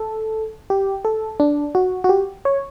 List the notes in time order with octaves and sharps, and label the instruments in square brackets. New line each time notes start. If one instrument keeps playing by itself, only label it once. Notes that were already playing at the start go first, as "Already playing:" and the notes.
Already playing: [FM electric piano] A4
G4
A4
D4
F#4
F#4
G4
C#5